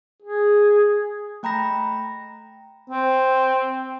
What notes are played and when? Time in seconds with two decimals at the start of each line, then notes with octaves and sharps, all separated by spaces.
0.22 G#4
1.43 A3 G5 A#5 B5 A#6
2.90 C4